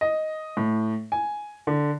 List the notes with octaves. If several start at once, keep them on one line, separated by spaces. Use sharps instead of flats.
D#5
A2
G#5
D3